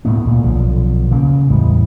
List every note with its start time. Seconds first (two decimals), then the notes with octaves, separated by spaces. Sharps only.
0.05 D2 A2 A3 B3
0.24 D2 A#2
0.44 B1 D3 F3
1.11 D2 C#3 A#3
1.50 E2 A2 G3 G#3